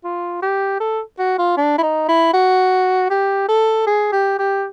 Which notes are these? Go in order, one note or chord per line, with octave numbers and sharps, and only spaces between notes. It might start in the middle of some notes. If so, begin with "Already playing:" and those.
F4
G4
A4
F#4
F4
D4
E4
D#4
E4
F#4
G4
A4
G#4
G4
G4